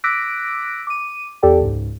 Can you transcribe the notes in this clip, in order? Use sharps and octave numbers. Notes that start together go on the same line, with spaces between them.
D6 E6 F#6 A#6 B6 D7
D6 D#7
E2 G4 A4 D5 G5
C#2 G#2